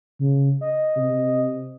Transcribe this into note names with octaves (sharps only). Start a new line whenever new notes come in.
C#3
D#5
C3